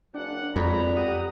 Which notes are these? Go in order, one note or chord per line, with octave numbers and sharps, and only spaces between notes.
F#1 D4 F#5
B1 F2 G#3 D5 A#5 B5
G4 F#5 D#6